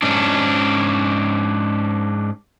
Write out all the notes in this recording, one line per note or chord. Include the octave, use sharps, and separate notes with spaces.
G#2 C#4 D4